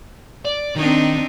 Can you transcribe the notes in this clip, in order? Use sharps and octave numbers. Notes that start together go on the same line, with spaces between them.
D5
D#3 C4 D4 D#4